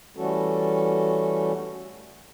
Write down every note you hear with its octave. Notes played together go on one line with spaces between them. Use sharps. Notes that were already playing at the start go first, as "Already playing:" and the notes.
E3 G3 A3 C#4 F#4 A4